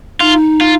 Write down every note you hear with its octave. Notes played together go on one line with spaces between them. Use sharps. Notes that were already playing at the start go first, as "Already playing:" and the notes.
D#4 F4
F4